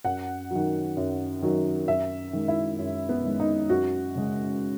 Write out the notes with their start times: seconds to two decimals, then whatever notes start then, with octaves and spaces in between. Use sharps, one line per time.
0.05 F#2 F#5
0.51 D#3 F#3
0.97 F#2
1.42 D#3 F#3
1.87 F#2 E5
2.33 D#3 G#3
2.48 E4
2.79 F#2
3.09 B3
3.24 D#3 G#3
3.40 D#4
3.70 F#2 F#4
4.15 C#3 G#3